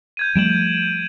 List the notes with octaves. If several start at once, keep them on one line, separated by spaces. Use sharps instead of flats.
G6 G#6 D#7
F3 G3 A3 D7 E7 F#7
D#7